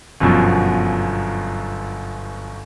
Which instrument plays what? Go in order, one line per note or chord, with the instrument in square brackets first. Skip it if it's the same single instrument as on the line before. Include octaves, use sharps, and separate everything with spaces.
[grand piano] G1 F#2 B2 F3